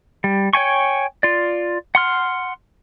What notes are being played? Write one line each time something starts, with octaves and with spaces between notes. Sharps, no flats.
G3
C#5 G5 G#5 C#6
F4 D5
F#5 C6 F6